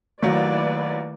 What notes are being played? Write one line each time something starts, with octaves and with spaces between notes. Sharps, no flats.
D#2 D#3 F#3 A3 E4 B4 D5